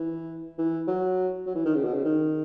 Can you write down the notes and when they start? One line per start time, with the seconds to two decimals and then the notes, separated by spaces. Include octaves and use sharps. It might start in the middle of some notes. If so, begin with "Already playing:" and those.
Already playing: E3
0.58 E3
0.88 F#3
1.47 F#3
1.55 E3
1.66 D#3
1.75 C#3
1.85 B2
1.94 C#3
2.05 D#3